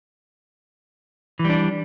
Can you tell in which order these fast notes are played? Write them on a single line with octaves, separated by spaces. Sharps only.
E3 G3 D4